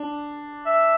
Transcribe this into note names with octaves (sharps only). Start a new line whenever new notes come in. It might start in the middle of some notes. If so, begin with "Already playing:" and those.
Already playing: D4
E5